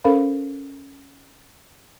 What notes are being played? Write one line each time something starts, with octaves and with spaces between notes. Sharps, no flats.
C#4 A4 A#4 C5 F5 B5